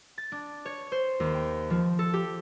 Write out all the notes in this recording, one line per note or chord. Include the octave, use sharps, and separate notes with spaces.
A6
D4
C#5
C5
D#2
G5
F3
A4
G4